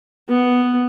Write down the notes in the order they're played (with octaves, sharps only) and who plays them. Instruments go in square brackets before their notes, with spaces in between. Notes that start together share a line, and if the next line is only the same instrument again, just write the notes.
[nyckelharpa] B3